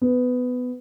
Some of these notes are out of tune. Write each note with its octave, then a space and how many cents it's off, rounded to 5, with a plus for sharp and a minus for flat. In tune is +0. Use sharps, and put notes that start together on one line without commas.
B3 +15